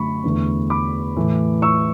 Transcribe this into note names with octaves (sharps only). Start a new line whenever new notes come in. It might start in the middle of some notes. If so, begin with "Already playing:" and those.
Already playing: F#2 D3 A3 B5 C#6
E2 D3 A3
B5 D6
A2 E3 A3
C#6 E6